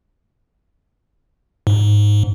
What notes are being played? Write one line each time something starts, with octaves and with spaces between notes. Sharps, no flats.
G#2